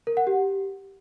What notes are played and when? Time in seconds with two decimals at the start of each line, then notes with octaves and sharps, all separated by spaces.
0.07 A#4
0.17 F#5
0.27 G4